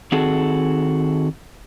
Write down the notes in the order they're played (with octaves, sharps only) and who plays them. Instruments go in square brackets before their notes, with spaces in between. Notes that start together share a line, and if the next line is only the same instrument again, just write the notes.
[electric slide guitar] D#3 C4 F#4 G#4 A4